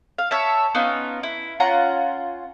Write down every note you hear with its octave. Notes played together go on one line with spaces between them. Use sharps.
F5
C#5 E5 A5
B3 C#4 D#4 F4
E4
C#4 F4 F#5 A#5